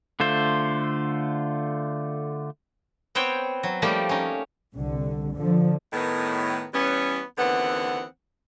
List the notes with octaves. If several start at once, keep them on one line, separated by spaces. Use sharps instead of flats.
D3 A3 F4 C5
B3 C4 C5 C#5 G5
F#3
F3 G3 A3 A#3 D#4 G4
C#4 D#4
C2 D3
D3 F3
A2 D#3 B3
E3 G3 B3 C#4
D#2 D3 E3 B3 C4 F#5